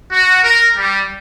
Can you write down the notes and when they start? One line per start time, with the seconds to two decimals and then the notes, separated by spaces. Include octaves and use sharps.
0.12 F#4
0.44 A#4
0.78 G3